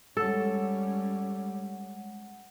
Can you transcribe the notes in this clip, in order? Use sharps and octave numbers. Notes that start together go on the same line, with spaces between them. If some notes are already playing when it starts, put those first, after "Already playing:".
G3 G#3 C#4 A4 F#5